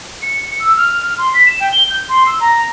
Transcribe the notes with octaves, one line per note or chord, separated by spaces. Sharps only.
C#7
E6
F6
C6
B6
E7
G5
G7
G6
C6
E6
A#5